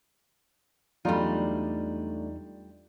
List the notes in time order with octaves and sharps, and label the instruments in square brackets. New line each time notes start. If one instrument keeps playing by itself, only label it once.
[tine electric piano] E2 D#4 D5 [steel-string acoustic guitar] F#3 A3 D4 [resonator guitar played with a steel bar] G3 F4